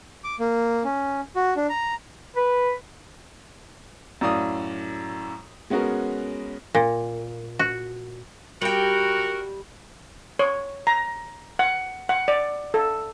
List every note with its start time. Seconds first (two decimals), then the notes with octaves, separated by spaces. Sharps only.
0.24 D6
0.40 A#3
0.84 C#4
1.36 F#4
1.56 D4
1.69 A#5
2.36 B4
4.21 F#2 A2 D5 F5 D#6
5.70 G#3 B3 C#4 F#4 A#4
6.75 A#2
7.59 F#4
8.62 G3 F#4 A#4 G5
10.39 C#5
10.87 A#5
11.59 F#5
12.09 F#5
12.28 D5
12.74 A4